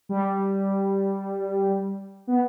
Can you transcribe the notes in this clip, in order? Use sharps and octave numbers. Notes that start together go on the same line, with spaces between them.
G3
B3